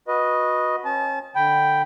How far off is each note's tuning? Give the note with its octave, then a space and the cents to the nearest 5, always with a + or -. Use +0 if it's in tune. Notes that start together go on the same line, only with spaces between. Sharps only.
F#4 -20 B4 -15 D#5 +0
C#4 -35 A5 -30
D3 +10 G5 +0 B5 +0